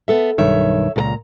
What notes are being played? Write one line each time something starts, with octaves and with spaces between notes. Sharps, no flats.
B3 A4 E5
B1 G2 D#3 C#5 E5
C#2 A#2 A#4 A#5